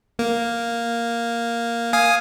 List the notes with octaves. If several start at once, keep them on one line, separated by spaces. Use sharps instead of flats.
A#3
F5 G#5 D#6